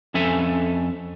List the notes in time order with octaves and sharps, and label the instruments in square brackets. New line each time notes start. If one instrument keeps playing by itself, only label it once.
[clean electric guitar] F2 C#4 A4 E5 G#5